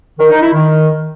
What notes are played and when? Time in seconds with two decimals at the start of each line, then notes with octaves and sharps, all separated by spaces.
0.19 D#3
0.31 D#4
0.42 E4
0.54 D#3